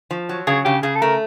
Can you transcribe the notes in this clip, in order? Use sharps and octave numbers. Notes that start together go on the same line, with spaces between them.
F3
F#3
C#3 G#4
C#3 G4
C#3 G#4
A4
A3 A#4